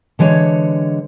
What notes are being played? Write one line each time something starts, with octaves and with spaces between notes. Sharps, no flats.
D3 E3 G#3 C#5